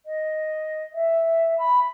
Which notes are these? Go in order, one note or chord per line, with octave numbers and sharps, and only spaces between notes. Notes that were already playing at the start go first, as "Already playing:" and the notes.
D#5
E5
B5